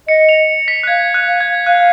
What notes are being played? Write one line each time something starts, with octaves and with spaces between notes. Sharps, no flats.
D#5 C#7
F7
B6
F#6
F5 G#6
F#6
F5
G#6
F5 F#6